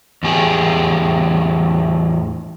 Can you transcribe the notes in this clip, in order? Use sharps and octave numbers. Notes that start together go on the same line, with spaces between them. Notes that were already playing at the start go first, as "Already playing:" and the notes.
E2 A2 G4 G#4